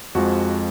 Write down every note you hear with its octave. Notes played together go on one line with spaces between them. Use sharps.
F2 F3 G#3 F#4